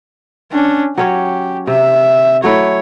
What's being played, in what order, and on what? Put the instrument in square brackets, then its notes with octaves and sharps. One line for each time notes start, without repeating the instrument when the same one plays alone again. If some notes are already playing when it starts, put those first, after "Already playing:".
[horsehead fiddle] C#4 D4
[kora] F#3 C#4 C#5 [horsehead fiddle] G4
[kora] C3 [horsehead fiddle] E5
[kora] F#3 A3 E4 [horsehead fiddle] C#5